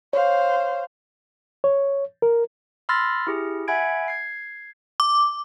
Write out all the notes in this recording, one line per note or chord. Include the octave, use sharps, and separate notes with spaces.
C5 C#5 F5
C#5
A#4
B5 C6 E6 F6 A6 A#6
E4 G4 G#4
E5 F#5 G#5 B5 G#6 D7
G#6 C7
D6